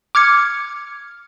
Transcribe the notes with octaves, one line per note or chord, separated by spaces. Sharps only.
D6 F6 G#6 C#7